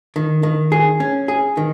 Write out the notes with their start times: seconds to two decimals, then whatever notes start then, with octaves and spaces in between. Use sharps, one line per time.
0.16 D#3
0.43 D#3
0.72 G#4
1.00 C#4
1.28 G#4
1.57 D#3